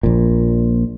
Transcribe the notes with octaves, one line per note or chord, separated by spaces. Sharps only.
A#1 A#2